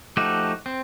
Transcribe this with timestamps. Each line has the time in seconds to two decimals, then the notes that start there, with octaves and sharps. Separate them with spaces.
0.17 F3 A3 D#4 F#4 G4
0.66 C4